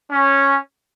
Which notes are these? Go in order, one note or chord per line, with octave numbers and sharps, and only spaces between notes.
C#4